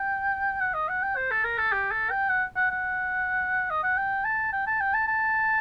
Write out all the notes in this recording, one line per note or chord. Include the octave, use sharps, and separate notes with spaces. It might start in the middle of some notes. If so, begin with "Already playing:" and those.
Already playing: G5
F#5
D#5
F#5
G5
C5
A4
A#4
A4
G4
A4
G5
F#5
F#5
F#5
D#5
F#5
G5
A5
G5
A5
G5
A5
A5